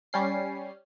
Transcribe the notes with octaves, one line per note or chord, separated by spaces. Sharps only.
G3 C#4 C7